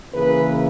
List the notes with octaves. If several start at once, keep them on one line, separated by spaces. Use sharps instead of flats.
C#3 E3 A#3 G#4 B4